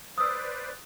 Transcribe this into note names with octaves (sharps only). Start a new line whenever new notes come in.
B4 C5 D5 D#6 E6